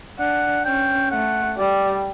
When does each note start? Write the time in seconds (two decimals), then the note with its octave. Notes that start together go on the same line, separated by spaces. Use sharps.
0.19 D4 F#5
0.66 C#4 G5
1.11 A3 F#5
1.58 G3 D5